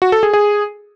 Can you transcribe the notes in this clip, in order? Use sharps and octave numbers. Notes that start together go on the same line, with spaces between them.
F#4
A4
G#4
G#4